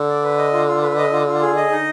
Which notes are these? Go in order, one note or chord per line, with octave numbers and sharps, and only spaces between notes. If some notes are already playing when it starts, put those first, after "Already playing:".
Already playing: D3
D5
B4
D#5
F4
F4
B4
D#5
F4
F4
G#4
D#5
D#4